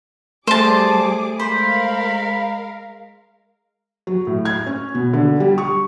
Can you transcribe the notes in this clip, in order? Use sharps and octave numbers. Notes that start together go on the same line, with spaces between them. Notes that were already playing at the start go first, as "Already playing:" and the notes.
G3 A3 G#4 C5 A5 D6
G#3 A#4 C5 F5 B5
F#3
A2
G#6
C#4
B2
D3
G3
C#6